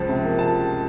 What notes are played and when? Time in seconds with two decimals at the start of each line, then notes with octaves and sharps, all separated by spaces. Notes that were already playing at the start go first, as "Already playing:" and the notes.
Already playing: C#2 F3 A5
0.09 C3
0.24 A#3
0.39 A5